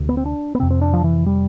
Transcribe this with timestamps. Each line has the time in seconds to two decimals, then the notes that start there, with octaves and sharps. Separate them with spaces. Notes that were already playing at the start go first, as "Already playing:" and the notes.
Already playing: D2 C3
0.09 B3
0.17 C4
0.26 D4
0.55 B3
0.59 C3 C4
0.62 F2
0.71 C4
0.81 D4
0.93 F3
1.04 E3
1.26 G3